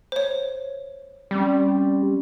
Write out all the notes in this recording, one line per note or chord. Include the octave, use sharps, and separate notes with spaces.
C5 C#5
G3 C4 C#4